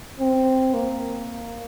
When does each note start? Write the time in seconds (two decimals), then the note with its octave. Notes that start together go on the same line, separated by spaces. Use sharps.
0.20 C4
0.74 A#3